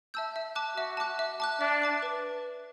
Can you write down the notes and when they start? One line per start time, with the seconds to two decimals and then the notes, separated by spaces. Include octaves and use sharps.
0.14 E5 A5 E6 G6
0.36 E5
0.55 A5 D6 F#6
0.77 F#4 E5
0.97 A5 D6 F#6
1.19 E5
1.40 A5 D6 F#6
1.60 D4 E5
1.82 A5 D6 F#6
2.02 B4